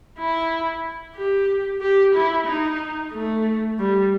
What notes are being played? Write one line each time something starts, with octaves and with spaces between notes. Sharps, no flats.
E4
G4
G4
E4
D#4
A3
G3